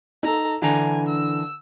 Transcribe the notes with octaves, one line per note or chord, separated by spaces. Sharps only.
D#4 A4 A#5
D3 E3 D4 G#5 A#5
E6